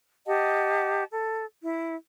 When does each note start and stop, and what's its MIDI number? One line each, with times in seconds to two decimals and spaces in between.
0.26 1.04 67
0.26 1.04 75
0.26 1.04 78
0.26 1.04 81
1.11 1.45 69
1.63 1.95 64